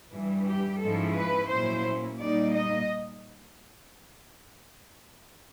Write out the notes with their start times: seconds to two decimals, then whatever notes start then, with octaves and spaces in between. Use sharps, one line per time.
0.12 G2 E3 G3
0.46 G4
0.81 G#2 F3 G#3 C#4 E4 A4
1.15 B4
1.49 A#2 F#3 A#3 C#4 E4 C5
2.18 A#2 G3 A#3 D#4 D5
2.53 D#5